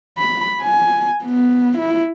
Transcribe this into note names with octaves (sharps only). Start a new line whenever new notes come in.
B5
G#5
B3
E4